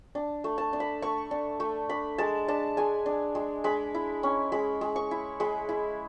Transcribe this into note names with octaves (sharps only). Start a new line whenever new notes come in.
D4
A3
A5
D4
B5
A3 C#6
D4
A3
D4 B5
G#3 A5
D4 A5
G#3 G#5
D4
G#3
G#3 B5
E4
C#4
G#3 B5
G#3
C#6
E4
G#3 B5
E4